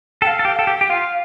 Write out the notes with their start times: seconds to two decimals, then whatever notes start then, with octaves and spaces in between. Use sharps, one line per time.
0.22 A4 G5
0.27 F5
0.39 A4
0.45 G4
0.56 A4 G5
0.67 G4
0.81 G4
0.89 F4 F5